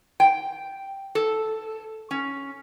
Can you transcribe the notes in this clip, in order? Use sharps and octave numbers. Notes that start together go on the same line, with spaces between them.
G5
A4
C#4